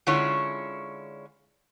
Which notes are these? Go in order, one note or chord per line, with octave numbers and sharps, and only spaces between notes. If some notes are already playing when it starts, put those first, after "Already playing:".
D3 G#3 C#4 E4 F4 C#5